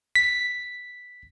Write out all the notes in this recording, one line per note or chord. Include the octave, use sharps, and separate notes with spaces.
B6